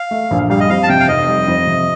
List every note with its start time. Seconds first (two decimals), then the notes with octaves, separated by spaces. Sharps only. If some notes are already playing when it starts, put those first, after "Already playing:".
Already playing: F5
0.11 A3
0.31 A#1
0.50 G3 F5
0.60 D#5
0.69 F2 F5
0.83 A5
0.89 C3 G5
1.00 F5
1.08 F1 D#5
1.27 G3
1.48 F2
1.67 C3